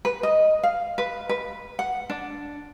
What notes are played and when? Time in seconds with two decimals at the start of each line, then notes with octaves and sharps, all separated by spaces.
0.05 B4
0.23 D#5
0.63 F5
0.98 B4
1.29 B4
1.79 F#5
2.10 D4